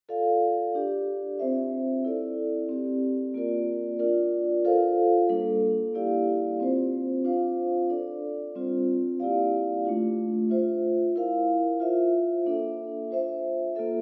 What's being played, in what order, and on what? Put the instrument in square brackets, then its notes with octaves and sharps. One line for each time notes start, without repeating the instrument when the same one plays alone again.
[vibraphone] F4 A4 D5 F5
D4 G4 D5
C4 F4 C5 E5
E4 A4 D5
C4 G4 D5
A#3 F4 A#4 D5
D4 F4 A#4 D5
F4 A4 C5 F5
G3 A#3 D4 A4
A#3 E4 G4 D5 F5
C4 F4 C5
D4 F4 C5 F5
D4 A4 D5
G3 C4 F4 C5
A#3 E4 G4 D5 F5
A3 D4 F4
F4 C5 E5
E4 A#4 F5
F4 C5 E5
A#3 D4 A4 E5
F4 C5 E5
A#3 F4 A4 E5